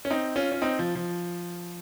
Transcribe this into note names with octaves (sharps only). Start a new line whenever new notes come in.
C#4
C4 D#4
C#4 F4
C#4
C4 D#4
F3
F3